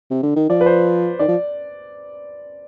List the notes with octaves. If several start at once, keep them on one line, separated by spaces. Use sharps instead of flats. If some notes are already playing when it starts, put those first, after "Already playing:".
C3
D3
D#3
F3 D5
B4
C5
D#3 D5
F3